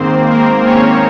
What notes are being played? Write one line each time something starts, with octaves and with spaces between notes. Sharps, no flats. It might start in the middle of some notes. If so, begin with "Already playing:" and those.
Already playing: G#2 D#3 A#3 C4 C5
A#3 A#4
C#4 C#5